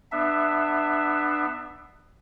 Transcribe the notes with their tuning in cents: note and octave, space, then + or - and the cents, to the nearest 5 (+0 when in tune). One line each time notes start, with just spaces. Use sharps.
B3 +0 D4 +30 E5 +0